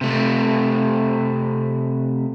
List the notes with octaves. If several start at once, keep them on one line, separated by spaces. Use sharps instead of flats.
C3 A3